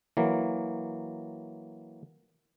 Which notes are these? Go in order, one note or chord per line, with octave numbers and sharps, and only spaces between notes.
E3 F#3 A#3